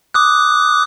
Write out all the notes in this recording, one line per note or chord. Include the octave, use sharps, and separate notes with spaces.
D6 D#6 F#6